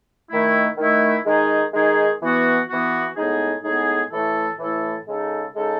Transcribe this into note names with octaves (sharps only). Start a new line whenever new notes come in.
D#3 A3 E4
D#3 A3 E4
D#3 G#3 D#4 G#4
D#3 G#3 D#4 G#4
E3 B3 F#4
E3 B3 F#4
A2 G#3 B3 D#4 G#4
A2 G#3 B3 D#4 G#4
A2 E3 A3 E4 A4
A2 E3 A3 E4 A4
C#3 G#3 D#4 A4
C#3 G#3 D#4 A4